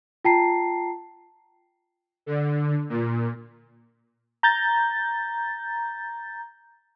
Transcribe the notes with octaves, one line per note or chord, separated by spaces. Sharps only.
F4 G5 A5 A#5 C7
D3
A#2
A#5 G6 A6